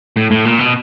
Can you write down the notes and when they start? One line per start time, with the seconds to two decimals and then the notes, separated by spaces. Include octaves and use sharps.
0.17 A2
0.31 A2
0.45 A#2
0.59 B2